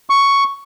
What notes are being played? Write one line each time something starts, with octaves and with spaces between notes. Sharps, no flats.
C#6